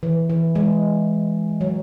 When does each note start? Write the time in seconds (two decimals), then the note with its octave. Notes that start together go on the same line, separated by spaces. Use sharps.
0.03 E3
0.30 E3
0.55 G#3
1.61 F#3